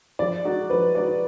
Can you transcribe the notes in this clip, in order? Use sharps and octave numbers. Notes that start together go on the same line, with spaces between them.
F3 D5
G#3 D#4 F#4
F3 B4
G#3 D#4 F#4 D5